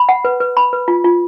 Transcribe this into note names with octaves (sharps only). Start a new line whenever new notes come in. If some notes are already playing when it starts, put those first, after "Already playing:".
Already playing: B5
F#5
B4
B4
B5
B4
F4
F4